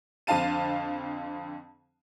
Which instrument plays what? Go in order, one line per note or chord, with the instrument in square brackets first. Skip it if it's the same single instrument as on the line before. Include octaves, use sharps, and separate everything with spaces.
[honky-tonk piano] F2 D3 C4 F5 A5 D#7